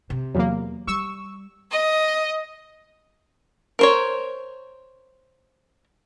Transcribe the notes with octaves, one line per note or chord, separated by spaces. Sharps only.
C3
E2 F#3 A#3
G3 C#6 E6
D#5
A#4 C5 C#5